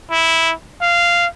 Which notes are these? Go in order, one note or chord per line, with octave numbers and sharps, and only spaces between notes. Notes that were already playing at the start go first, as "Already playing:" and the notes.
E4
F5